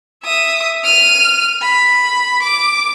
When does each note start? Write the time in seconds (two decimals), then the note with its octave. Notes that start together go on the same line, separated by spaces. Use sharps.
0.24 E5 D#6
0.84 F6 D#7
1.62 B5
2.43 D6